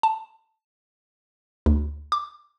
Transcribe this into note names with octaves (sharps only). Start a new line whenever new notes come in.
A5
D2
D6